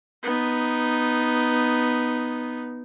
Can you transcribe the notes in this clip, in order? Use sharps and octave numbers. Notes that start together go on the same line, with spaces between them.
B3 D#4